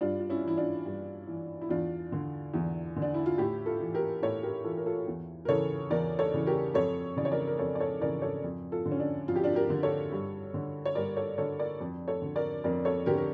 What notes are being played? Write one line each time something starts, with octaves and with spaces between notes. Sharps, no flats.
G2 D4 F4
F4
C#4 E4
E3 E4
D4 F4
G2
E3
E4
E2 D4 F4
D3
E2
D3
D4
E4
F4
A2 E4 G4
F4 A4
E3
G4 A#4
A2 A4 C#5
G4 A#4
E3 F4 A4
A#4
F4 A4
E2
A#4
C#3 E3 A4 C#5
E2 A#4 D5
A4 C#5
C#3 E3
G4 A#4
F2 A4 C#5
C#3 E3 D5
C#5
A#4 D5
A#4
F2 A4 C#5
D5
A4 C#5
C#3 E3 A#4 D5
A4 C#5
F2
F4 A4
D3
C#4
D4
F2 F4
G4
D4 F4
G4 A#4
D3
A4 C#5
G2
D3
C#5
G2 A#4 D5
A4 C#5
D3 A4 C#5
A#4 D5
F2
A4 C#5
D3
A#4 D5
F2 A#4 D5
A4 C#5
D3 G4 A#4
A#4